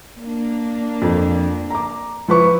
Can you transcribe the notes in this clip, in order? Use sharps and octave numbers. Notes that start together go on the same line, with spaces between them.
A#3 D4
F2
A#5 D6
F3 E4 B4 C#6